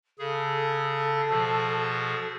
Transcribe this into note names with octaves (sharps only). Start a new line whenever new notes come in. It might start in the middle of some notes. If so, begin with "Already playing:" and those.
C#3 G#4 A4
B2 F3 G#4